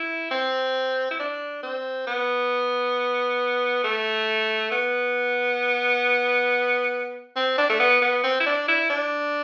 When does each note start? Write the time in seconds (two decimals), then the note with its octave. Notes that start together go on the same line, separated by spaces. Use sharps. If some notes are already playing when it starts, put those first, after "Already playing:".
Already playing: E4
0.31 C4
1.11 E4
1.19 D4
1.63 C4
2.07 B3
3.84 A3
4.71 B3
7.36 C4
7.58 D4
7.69 A3
7.79 B3
8.01 B3
8.23 C4
8.40 E4
8.46 D4
8.68 E4
8.90 D4